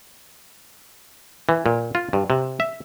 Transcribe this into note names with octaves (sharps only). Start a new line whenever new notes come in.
E3
A#2
F4
G2
C3
E5